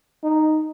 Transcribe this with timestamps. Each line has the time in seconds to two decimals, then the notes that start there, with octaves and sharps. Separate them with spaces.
0.24 D#4